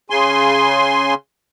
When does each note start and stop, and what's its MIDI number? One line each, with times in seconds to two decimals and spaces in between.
0.10 1.14 49
0.10 1.14 80
0.10 1.14 84